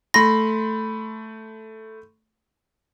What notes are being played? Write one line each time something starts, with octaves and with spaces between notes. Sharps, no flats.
A3 B5 C6 A#6